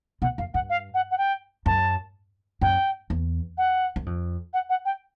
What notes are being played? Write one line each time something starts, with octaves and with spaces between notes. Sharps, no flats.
B2 F#5
F#2 F5
G2 F#5
F5
F#5
F#5
G5
F#2 A5
F#2 G5
E2
F#5
F#2
F2
F#5
F#5
G5